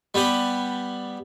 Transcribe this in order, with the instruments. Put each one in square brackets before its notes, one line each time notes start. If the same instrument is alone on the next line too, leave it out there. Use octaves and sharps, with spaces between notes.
[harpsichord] G3 B3 G4 B4